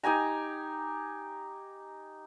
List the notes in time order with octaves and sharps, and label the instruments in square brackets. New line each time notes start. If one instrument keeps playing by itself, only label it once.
[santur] D#4 G4 G#5 A#5